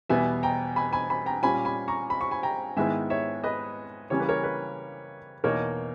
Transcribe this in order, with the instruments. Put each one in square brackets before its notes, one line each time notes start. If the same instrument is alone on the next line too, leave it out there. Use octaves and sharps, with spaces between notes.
[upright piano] E2 B2 G3 B3 E5 G#5
G5 A#5
G#5 B5
G#5 B5
G#5 B5
G5 A#5
A#2 G3 C#4 G#5 B5
G#5 B5
A#5 C#6
B5
C#6
G#5 B5
G5 A#5
G#2 D#3 G#3 B3 E4 E5 G#5
C#5 E5
B4 D#5
C#3 E3 G3 A#3 C#4 C#5
B4
A#4 C#5
B4
E2 B2 A#3 D#4 A#4 C#5